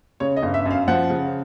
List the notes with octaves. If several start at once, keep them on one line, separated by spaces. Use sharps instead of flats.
C#3 C#5
D#5
G1
E5
F#2 F5
F3 F#5
C#3